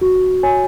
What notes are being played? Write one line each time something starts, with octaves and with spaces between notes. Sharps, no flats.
F#4
C#5 G#5